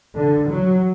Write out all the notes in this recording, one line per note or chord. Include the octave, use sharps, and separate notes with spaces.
D3
F#3